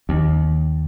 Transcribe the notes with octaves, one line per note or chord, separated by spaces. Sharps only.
D#2